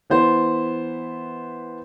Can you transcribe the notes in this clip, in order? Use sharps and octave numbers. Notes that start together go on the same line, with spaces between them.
E3 B3 C5